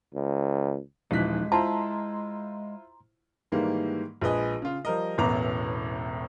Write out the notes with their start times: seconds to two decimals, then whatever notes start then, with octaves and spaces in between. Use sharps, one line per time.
0.14 C#2
1.11 D#1 E3 F3 G#3 D#4 F#6 B6
1.52 E4 F4 C5 A5 A#5 C6
3.52 G#2 D#3 E3 G3 G#3 A#3
4.22 A#1 G#3 B4 D#5 G#5
4.62 C#3 F4
4.85 F3 G3 A#4 D#5
5.18 E1 A1 A2 B3 A#5 D6